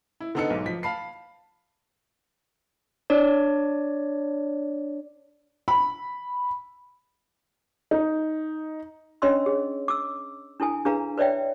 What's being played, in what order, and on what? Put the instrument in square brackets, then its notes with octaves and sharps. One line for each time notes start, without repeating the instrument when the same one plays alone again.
[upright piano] E4
D3 B3 D#4 A4 E6 C#7
B1 G#2
F3 B6
F5 A5 B5 C7
[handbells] D4 C#5 D5
[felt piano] B5
D#4
[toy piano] C#4 D4 C#5 D#5 C6 E6
G#4
D6 E6
D4 E4 A4 G#5
D4 G#4 B4 F5 A#5
B4 C#5 D5 E5 G5